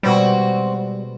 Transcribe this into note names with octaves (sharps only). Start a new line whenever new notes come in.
B2 G3 G#3 C4 F#4